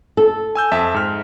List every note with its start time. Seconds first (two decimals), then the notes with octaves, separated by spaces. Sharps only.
0.17 A4
0.55 G#5 E6 G6
0.72 F2 E5 A5
0.94 G#2 F6